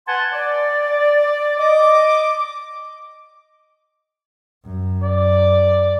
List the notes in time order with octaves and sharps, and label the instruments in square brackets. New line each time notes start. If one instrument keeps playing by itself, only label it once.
[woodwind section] B4 F#5 G#5 A5 C6
D5
D#5 D6
[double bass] F#2
[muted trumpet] D5